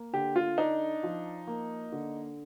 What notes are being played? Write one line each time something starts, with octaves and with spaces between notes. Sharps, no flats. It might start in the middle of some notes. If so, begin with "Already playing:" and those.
Already playing: A#3
D3 G4
F4
D4 D#4
F3
A#3
D3